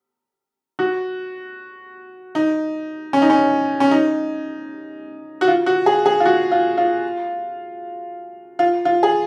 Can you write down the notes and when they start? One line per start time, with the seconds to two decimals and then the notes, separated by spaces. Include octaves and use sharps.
0.79 F#4
2.35 D#4
3.13 C#4
3.22 D#4
3.30 C#4
3.80 C#4
3.91 D#4
5.41 F#4
5.48 F4
5.66 F#4
5.86 G#4
6.06 G#4
6.20 F4
6.25 F#4
6.51 F4
6.77 F4
8.59 F4
8.85 F4
9.03 G#4